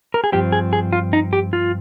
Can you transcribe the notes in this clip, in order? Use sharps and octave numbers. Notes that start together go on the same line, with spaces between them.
A#4
G#4
G2 F3 C4 G4
G#4
G#4
F4
D#4
G4
F4